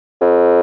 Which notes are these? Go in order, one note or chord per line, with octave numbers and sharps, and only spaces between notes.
F2